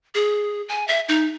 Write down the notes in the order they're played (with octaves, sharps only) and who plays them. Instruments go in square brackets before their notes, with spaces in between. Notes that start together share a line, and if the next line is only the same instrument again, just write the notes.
[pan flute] G#4
G#5
E5
D#4